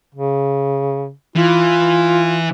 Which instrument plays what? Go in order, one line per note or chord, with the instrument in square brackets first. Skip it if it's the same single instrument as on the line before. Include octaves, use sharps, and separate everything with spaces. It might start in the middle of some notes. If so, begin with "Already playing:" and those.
[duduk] C#3
[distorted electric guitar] E3 [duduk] F4